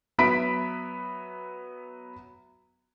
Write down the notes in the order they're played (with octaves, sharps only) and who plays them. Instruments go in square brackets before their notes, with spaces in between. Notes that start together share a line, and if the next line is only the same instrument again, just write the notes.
[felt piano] F#3 B3 E5 B5 B6 D7